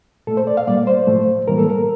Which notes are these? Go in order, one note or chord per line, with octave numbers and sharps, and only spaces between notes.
A#2 A3 A4
C5
D5
F5
A#2 G3 A#3 D5
C5
A2 F3 A3
A2 E3 G3 A#3 A#4
A4
A#4